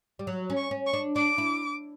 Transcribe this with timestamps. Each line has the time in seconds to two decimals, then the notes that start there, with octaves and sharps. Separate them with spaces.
0.19 G3
0.27 F#3
0.50 C#4
0.57 C#6
0.71 C#4
0.87 C#6
0.93 D4
1.16 D4 D6
1.38 E4